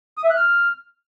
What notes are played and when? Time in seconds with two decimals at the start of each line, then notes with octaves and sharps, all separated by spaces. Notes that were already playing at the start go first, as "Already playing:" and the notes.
0.18 D#6
0.24 E5
0.30 F#6
0.36 F6